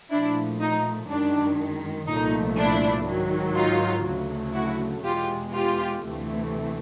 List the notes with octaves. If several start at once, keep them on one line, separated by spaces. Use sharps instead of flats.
A#2 F3 A3 D4 E4
D#4
F#2 D#3 G#3 D4
C2 A#2 F3 A3 D#4
D4 E4
G#2 D#3 F#3
D#4 F4
D2 C#3 F#3 A3
E4 F#4
E2 B2 G#3 F4 G4
F4 G4
D2 C3 E3 A3